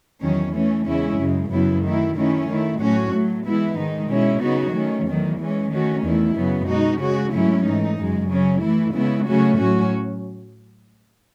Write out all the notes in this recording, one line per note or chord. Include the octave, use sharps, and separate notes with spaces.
E2 D#3 F#3 C#4
E3 A3 C#4
E2 C#3 G#3 C#4 E4
F#2 C#3 G#3
F#2 C#3 F#3 B3 E4
D#3 A3 E4
D#3 A3 C#4 E4
D#3 A3 E4
A2 F#3 C#4 F#4
A2 F#3 A3
E3 G#3 B3 E4
G#2 D#3 G#3 D#4
B2 G#3 C#4 E4
C#3 F#3 B3 D#4 F#4
D#3 A3 C#4
E2 D#3 F#3 A3
E3 G#3 C#4
D#3 A3 C#4 F#4
E2 D#3 A3 E4
F#2 C#3 F#3 B3
B2 G#3 D#4 F#4
C#3 G#3 C#4 F#4
G#2 F#3 A3 C#4 E4
G#2 E3 A3 D#4
F#2 C#3 G#3
C#3 F#3 C#4
E3 A3 E4
C#3 G#3 B3 E4
C#3 F#3 A3 C#4 F#4
A2 F#3 C#4 F#4